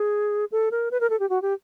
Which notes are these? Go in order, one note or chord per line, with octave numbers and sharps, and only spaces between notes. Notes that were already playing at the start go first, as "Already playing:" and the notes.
Already playing: G#4
A4
A#4
B4
A#4
A4
G4
F#4
G4